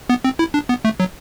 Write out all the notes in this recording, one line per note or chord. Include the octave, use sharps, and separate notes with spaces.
B3
C4
E4
D4
B3
A3
F#3